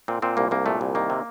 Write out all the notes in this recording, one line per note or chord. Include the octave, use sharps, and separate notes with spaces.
A#2 C4
A#2 C4
C2 A#3
C2 A#3
A#2 A3
C2
D#3 A#3
C3